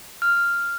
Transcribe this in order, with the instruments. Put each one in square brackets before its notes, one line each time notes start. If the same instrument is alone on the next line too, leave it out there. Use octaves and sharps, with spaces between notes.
[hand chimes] F6